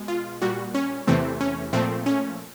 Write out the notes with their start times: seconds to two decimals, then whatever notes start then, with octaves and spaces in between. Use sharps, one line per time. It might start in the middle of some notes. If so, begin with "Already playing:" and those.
Already playing: B2 G#3
0.08 F4
0.42 A#2 G3 F#4
0.75 C#4
1.08 E2 C3 E3 A3 C4
1.41 C#4
1.73 A#2 F3 A3 C4
2.06 C#4